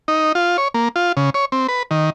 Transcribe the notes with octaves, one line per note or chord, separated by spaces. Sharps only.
D#4
F4
C#5
A#3
F4
C#3
C#5
C4
B4
D#3